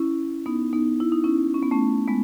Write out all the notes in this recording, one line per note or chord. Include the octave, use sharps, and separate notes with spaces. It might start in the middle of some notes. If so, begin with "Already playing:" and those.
Already playing: C#4 E4
B3 D#4
B3 D#4
E4
D#4
C#4 E4
C#4
B3
A3 C#4
G#3 B3